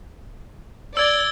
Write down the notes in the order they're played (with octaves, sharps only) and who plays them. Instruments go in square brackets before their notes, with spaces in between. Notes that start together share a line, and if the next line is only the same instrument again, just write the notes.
[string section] D5 [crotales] E6 G#6 G7